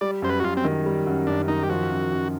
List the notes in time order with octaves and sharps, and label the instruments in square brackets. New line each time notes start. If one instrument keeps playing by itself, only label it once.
[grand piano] G3 [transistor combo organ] D5
[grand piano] F#2 [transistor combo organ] C5
[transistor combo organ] B4
F#4
[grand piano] F#2 [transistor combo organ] F4
[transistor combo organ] C4
[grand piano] D#3
G3
F#2
[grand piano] F#2 [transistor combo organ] D4
[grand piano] D#3 [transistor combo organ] D#4
[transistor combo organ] G4
[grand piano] F3 [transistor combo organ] F#4
[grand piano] F#2
F#2